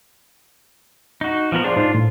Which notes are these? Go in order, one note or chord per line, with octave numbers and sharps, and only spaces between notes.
D#4 F#4
F3 B3 A#4
D4 F4 G#4 C5 D5
G#2 D#4 C5
A2